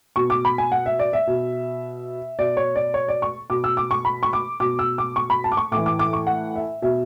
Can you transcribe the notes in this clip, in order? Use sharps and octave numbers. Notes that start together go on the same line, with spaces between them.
B2 C#6
D6
B5
G#5
F#5
E5
D5
E5
B2
B2 D5
C#5
D5
C#5
D5
C#6
B2 D6
E6
D6
C#6
B5
C#6
D6
B2 D6
E6
D6
C#6
B5
A5
D6
C#6
A2 E3 D6
D6
D6
C#6
F#5
E5
B2 E5